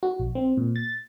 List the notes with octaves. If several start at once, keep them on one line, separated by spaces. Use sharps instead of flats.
F#4
A#1
C4
A#2
A6